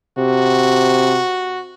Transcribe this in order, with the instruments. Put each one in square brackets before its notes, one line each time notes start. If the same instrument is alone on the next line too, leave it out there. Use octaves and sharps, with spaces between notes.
[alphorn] C3 [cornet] F#4